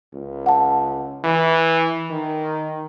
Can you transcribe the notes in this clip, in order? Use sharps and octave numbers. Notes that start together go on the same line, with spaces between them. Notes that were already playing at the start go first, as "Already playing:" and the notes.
C#2
F#5 A5
E3
D#3